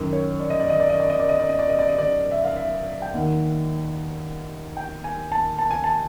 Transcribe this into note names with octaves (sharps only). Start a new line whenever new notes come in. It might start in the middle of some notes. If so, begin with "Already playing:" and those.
Already playing: F#2 D#3
C#5
D5
D#5
D5
D#5
D5
D#5
D5
D#5
D5
D#5
D5
D#5
D5
D#5
D5
D#5
D5
E5
F5
E5
G5
D#2 D#3 F#5
G5
G#5
A5
A5
G#5
A5